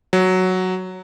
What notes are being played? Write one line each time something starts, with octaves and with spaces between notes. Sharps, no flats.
F#3